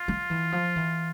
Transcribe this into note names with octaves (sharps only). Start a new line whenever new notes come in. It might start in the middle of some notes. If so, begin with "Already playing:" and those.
Already playing: F4
F3
E3
F3
E3